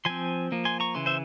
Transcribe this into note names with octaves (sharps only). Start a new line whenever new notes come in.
F3 C4 G#5 C6
F3 A#3
G#5 C6
A#5 C#6
C#3 E3 C6
C5 E5